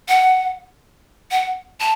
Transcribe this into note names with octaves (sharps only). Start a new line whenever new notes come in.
F#5
F#5
A5